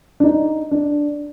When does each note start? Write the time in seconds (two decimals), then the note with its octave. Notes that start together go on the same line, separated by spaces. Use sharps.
0.20 D4
0.24 D#4
0.71 D4